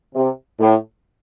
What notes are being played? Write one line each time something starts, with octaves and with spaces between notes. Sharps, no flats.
C3
A2